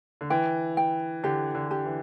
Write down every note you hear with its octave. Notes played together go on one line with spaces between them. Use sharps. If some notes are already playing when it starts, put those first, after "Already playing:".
D3
E3 G5
G5
D3 G4
D3
G4
E3